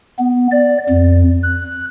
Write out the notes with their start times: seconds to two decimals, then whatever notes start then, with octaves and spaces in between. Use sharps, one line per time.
0.19 B3
0.52 D5
0.89 F2
1.43 F#6